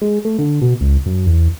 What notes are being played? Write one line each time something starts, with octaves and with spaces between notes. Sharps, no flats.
G#3
A3
D3
B2
C#2
F#2
E2